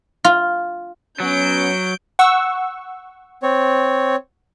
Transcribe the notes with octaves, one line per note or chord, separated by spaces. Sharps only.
F4
F#3 B3 C#4 G6 D7
F#5 C#6 E6
C4 C#5